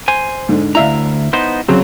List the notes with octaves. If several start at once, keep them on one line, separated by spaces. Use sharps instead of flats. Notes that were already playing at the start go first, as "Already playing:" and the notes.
C5 G#5
G#2 D3
D2 E4 E5 F5 A#5
B3 D#4 C5
C#3 F#3 C4